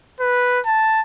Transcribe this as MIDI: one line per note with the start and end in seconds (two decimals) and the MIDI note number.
0.20 0.60 71
0.66 1.01 81